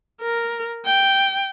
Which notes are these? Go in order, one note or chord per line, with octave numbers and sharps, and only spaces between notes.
A#4
G5